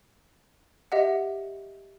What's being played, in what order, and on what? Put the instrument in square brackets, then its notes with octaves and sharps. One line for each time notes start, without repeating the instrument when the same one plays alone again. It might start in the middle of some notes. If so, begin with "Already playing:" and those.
[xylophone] G4 D#5 E5 F#5